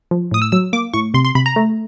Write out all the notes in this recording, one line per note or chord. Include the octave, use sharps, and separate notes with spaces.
F3
A2 D#6
E6
F#3 E6
A#3 D6
A2 C#6
C3 C6
C6
C3 B5
A#5
A3